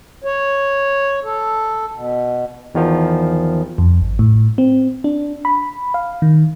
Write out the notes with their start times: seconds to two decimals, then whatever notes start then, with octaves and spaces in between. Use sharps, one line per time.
0.24 C#5
1.24 A4
1.92 B2
2.75 E2 D#3 F3
3.78 F2
4.01 G#1
4.19 A2
4.58 C4
5.04 D4
5.45 B5
5.94 F5
6.22 D#3